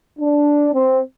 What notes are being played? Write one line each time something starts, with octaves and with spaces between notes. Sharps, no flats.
D4
C4